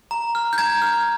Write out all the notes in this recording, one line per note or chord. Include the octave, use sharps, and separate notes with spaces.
A#5
F6
G6
A#5 G#6
F6